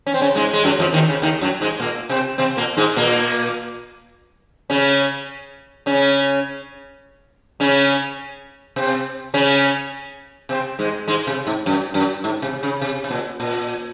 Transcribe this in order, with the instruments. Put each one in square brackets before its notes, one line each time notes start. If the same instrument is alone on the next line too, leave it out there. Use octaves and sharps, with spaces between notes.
[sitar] C#4
C4
C#3 C#4
G#2 G#3
G#3
F#2 F#3
F2 F3
D#2 D#3
C#3
D#2 D#3
F#2 F#3
G#2 G#3
A#2 A#3
C3 C4
C3 C4
A#2 A#3
G#2 G#3
A#2 A#3
C#3 C#4
C#3 C#4
C#3 C#4
C3 C4
C#3 C#4
C3 C4
G#2 G#3
G#2 G#3
C3
G#2
F#2
F#2
G#2
C3
C#3
C3
C3
A#2
A#2